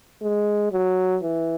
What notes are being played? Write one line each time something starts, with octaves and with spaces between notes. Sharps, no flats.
G#3
F#3
E3